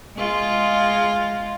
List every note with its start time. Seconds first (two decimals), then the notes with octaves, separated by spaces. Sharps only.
0.17 G#3 F4